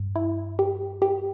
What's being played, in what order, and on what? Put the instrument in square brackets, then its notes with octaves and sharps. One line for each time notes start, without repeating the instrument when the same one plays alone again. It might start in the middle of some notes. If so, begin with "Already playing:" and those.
Already playing: [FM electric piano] G2
[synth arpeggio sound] E4
G4
G4